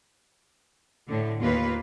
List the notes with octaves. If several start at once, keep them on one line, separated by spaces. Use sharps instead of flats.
A2 D3
D#2 A#3 F4 B4